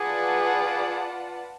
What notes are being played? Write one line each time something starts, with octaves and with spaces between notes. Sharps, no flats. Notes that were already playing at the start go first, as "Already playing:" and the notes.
Already playing: F4 G#4 B4 D5 F#5 A5